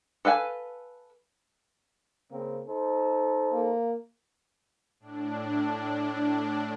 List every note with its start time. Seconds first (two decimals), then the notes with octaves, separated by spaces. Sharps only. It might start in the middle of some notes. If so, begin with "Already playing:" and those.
0.25 A4 B4 F5 G#5
2.32 C#3 A#3 C4
2.68 D#4 A4 C5
3.52 A#3
5.00 A2 D4